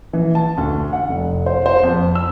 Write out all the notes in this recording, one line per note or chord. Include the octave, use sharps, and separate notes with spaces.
E3
A5
D2
F#5
F1
C5
C5
F2
E6